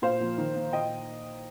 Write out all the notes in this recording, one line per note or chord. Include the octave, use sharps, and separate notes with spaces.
A#2 C5 F5
F3 A#3
D#3
A#3
A#2 D#5 G5